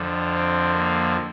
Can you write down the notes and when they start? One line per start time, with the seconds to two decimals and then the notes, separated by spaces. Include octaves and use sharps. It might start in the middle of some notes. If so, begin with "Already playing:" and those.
Already playing: F2 D3 F3
0.34 C4
0.75 A#3